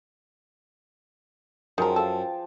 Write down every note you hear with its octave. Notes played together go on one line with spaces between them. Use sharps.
F#2 D#3 F3 G#3 A#4 G5
A4 F5 A5